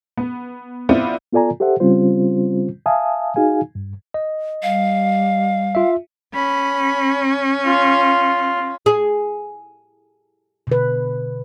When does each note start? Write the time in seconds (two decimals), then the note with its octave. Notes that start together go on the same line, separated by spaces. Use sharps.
0.17 B3
0.89 B3 C4 E4 F4 D5
1.33 B3 F4 A4 D5 G#5 A#5
1.60 G4 A4 C5 E5 F#5
1.80 C#3 G3 C4 C#4 F4 C5
2.86 E5 F5 G#5 A5 D#6
3.36 D#4 F#4 G#4 F5 G#5
3.75 G2
4.14 D#5
4.63 G3 F5
5.75 F4 E5
6.34 C#4 B5
7.65 F4
8.86 G#4
10.67 B2 D3 B4